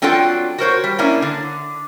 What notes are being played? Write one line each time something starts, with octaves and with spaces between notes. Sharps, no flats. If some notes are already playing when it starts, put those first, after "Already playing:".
F#3 C4 D4 F4 A4 G5
F#4 A#4 C5 C#5
G3
A#3 C#4 D4 E4
D3